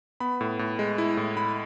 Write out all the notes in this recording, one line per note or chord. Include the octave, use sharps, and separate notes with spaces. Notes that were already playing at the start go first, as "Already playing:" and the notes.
B3 B5
A2
A2
G#3
E4
A2
E4 B5